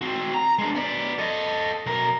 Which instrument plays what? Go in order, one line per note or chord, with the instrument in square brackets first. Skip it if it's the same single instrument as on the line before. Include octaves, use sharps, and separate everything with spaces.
[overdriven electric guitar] C4 F#4
A#5
G#3 D4
B3 D5
A4 D#5
B1 A#4